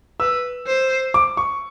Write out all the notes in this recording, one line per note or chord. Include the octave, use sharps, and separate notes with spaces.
B4 E6
C5
D6
C#6